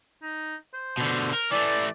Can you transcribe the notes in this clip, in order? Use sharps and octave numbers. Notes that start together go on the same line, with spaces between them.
D#4
C5
B2 D3
A#4
E3 A3 D5